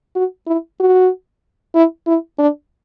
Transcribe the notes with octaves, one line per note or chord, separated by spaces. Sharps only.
F#4
E4
F#4
E4
E4
D4